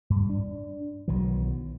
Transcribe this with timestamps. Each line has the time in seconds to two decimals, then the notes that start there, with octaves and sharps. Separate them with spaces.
0.10 G2
0.30 D4
1.08 B1 D#3 E3 F#3